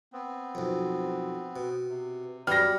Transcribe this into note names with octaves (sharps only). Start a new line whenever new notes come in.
B3 C4
B1 F2
B2
C3
F#3 G3 B3 F6 A#6